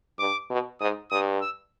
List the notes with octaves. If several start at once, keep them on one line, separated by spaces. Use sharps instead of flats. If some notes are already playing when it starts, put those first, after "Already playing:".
G2 D6
B2
G#2 D#6
G2 D#6
E6